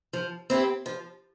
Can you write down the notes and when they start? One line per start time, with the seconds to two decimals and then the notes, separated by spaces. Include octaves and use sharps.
0.13 F3
0.50 C4 E4 G4
0.86 F3